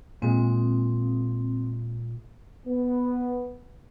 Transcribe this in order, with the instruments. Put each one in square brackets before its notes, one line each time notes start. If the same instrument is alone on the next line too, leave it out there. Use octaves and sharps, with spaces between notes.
[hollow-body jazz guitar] A#2 G#3 [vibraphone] C4
[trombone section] B3